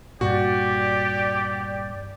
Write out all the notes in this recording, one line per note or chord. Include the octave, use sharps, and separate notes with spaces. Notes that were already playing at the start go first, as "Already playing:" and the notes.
G2 A#2 F#4 G4 D5